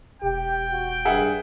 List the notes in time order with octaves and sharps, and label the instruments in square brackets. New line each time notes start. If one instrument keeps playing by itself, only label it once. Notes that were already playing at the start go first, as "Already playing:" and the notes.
[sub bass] E1 [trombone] G4 [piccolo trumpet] G5
[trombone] F#4
[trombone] G2 [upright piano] G#4 E5 F#5